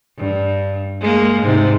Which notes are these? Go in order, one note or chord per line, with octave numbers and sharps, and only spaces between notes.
G2
G#3 A#3
G#2 C3